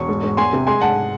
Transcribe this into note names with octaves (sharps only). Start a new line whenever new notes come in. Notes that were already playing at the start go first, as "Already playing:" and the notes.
Already playing: E1 C#6
G#2
G#2
E2 G#5 C6
C3
G#3 G#5 C6
G#2 F#5 A5